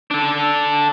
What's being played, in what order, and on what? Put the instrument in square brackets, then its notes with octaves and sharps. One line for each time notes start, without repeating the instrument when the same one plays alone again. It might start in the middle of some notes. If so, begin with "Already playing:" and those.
[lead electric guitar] D4 A4